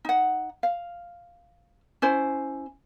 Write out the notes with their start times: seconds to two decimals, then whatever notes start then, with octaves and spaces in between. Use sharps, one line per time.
0.05 D#4 F#5
0.63 F5
2.02 C#4 E4 C5